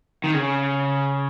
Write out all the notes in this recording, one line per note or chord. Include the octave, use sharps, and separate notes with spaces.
D#3
C#3